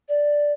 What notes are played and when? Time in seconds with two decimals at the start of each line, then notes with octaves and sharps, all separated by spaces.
0.09 D5